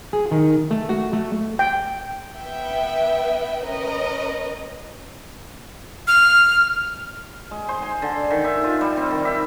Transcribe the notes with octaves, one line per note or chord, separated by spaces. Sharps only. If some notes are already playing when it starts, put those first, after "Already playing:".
G#4
D#3
A3
F#4
A3
G5
B3 B4 E5 G5
C#4 A#4 B4 D#5
F6
G#3
C5
G#5
D3
D#3
E5
F4
G3
C4
D#3
E5